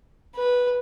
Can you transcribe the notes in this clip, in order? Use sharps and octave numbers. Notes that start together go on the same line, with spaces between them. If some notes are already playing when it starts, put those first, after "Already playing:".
B4